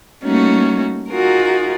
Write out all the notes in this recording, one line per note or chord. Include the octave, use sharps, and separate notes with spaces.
G3 A3 A#3 C#4 D#4 F#4
D#4 F4 F#4 G#4 A#4